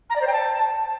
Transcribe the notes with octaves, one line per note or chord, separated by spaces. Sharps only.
A#5
D5
C5
G5
A5